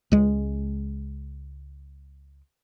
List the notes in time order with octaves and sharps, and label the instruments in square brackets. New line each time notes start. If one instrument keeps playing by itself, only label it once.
[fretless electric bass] C#2 G#3